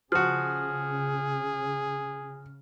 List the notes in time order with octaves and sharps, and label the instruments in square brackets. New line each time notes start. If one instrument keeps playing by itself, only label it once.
[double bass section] C#3 [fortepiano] F3 F#4 [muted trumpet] G#4 [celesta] F6